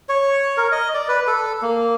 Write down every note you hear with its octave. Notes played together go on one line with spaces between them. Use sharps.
C#5
A#4
D#5
D5
B4
A4
A#3